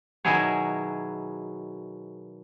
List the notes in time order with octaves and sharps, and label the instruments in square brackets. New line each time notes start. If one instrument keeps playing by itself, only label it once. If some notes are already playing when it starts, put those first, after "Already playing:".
[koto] B2 D#3 F#3 E4 G#4 C#5